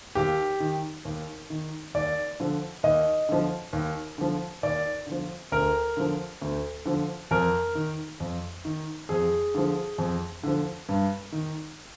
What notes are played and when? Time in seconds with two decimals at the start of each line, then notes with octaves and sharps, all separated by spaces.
0.15 D#2 G4
0.60 D#3
1.05 D#2
1.50 D#3
1.94 D#2 D5
2.40 D3 F3
2.83 D#2 D#5
3.29 D3 F3
3.73 D#2
4.18 D3 F3
4.63 D#2 D5
5.07 D3 F3
5.52 D2 A#4
5.97 D3 F3
6.42 D2
6.86 D3 F3
7.31 F2 A#4
7.75 D#3
8.20 F2
8.65 D#3
9.09 F2 G#4
9.55 D3 F3
9.98 F2
10.43 D3 F3
10.89 G2
11.32 D#3